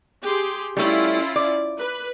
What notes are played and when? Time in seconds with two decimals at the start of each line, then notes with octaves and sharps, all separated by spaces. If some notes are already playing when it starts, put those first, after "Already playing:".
0.22 G4 G#4 C6
0.77 G3 A3 C#4 E4 F4
1.36 D5
1.78 B4